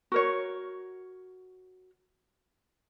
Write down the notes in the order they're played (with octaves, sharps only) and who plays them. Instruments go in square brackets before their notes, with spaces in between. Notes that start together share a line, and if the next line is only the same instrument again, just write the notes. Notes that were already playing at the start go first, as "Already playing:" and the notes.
[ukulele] F#4 A#4 C#5